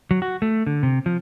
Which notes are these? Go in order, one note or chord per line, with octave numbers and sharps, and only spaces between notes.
F#3
F#4
A3
D3
C3
F3